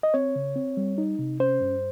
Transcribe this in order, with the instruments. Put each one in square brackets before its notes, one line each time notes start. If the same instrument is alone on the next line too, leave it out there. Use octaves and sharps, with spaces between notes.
[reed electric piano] D#5
C4 C#5
C#3
C4
G3
D#4
C3
C#4 C5
G2